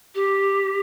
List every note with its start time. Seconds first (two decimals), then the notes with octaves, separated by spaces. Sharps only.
0.15 G4